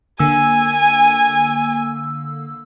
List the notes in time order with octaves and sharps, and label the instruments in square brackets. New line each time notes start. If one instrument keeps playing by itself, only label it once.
[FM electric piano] D3 A#3 E6 [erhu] G#5